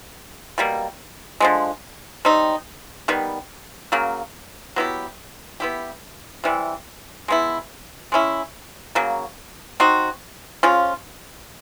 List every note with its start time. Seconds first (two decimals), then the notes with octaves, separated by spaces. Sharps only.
0.58 B2 G3 A#3
1.40 D3 F3 G#3
2.25 G3 C4 D#4
3.08 D#3 G3 B3
3.92 C#3 F#3 A#3
4.76 F#3 B3 E4 G4
5.60 B3 E4 G4
6.44 C3 E3 G3
7.28 G#3 B3 E4
8.12 G#3 C#4 E4
8.95 C#3 F#3 A#3
9.80 C4 D#4 F#4
10.63 F3 G#3 C#4 F4